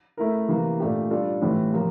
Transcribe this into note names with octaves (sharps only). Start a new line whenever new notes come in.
A3 E4 A#4
C3 E3 A#3
A#2 A3 D4 G4
G3 D4 F4 A4
A2 E3 G3 C4
C3 F3 A#3